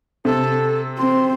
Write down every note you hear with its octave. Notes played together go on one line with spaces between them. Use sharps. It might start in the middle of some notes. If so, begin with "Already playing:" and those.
C3 A4
C4 C6